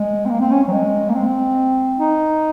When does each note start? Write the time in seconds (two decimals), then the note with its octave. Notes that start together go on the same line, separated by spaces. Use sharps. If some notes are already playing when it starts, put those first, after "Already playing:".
Already playing: G#3
0.26 C4
0.30 A#3
0.40 C4
0.51 C#4
0.68 F#3
0.72 G#3
1.10 A#3
1.14 C4
1.99 D#4